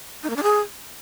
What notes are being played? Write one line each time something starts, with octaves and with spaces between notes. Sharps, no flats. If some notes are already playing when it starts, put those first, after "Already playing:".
D#4
A#3
D4
G#4